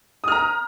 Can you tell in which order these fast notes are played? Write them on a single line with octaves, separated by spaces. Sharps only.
D#6 F6 A#5